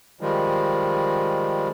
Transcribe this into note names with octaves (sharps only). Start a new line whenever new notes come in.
D#3 F3 G3 G#3